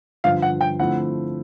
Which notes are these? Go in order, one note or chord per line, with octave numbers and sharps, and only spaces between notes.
G2 D3 F3 F5
F#5
G5
D3 F3 A3 C4 E4 F#5